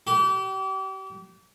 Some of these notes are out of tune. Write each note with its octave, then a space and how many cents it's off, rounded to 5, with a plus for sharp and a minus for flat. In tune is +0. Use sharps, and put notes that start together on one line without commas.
G4 -35